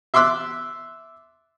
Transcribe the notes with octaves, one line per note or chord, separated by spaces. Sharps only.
E5 C6 D6 E6 F#6